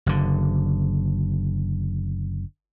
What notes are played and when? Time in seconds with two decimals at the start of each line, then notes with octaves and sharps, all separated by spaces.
0.06 F#1 D3